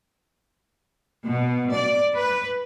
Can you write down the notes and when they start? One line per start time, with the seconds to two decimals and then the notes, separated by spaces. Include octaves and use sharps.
1.27 B2
1.73 D5
2.15 B4